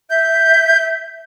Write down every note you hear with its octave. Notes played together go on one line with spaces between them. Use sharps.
E5 G6